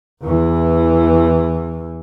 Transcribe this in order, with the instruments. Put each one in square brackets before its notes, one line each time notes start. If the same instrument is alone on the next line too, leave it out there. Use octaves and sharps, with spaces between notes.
[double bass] E2 E3